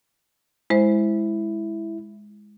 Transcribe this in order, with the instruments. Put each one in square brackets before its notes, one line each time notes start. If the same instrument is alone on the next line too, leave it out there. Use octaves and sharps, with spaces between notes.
[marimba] G#3 C5 [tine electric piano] E4